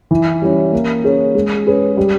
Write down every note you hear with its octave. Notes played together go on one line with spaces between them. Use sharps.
E3
G3 C#4 E4
A#3
C#4 G#4 C#5
G#3
C#4 G#4 B4
G3